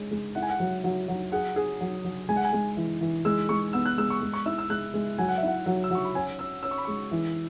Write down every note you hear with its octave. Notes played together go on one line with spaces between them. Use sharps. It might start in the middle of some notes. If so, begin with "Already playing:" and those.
Already playing: G#3 C#4
G#3
E4 F#5
G#5
F#5
F#3
F#3
F#3
G#4 F#5
G#4
F#3
F#3
G#3 G#5
F#5
G#5
G#3
E3
E3
G#3 E6
G#3 C#6
B3 E6
F#6
G#3 E6
C#6
G#3
C#6
E4 E6
E6
G#3 F#6
G#3
F#3 G#5
F#5
E5
E4 F#5
F#3
E6
F#3 C#6
B5
C#4 G#5
C#4 E6
C#4 E6
C#6
B5
G#3 C#6
E3